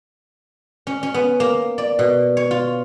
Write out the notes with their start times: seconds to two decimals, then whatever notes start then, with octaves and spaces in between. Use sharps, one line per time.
0.87 C#4
1.03 C#4
1.14 B3
1.40 A#3
1.78 D5
1.99 B2
2.37 C#5
2.51 F4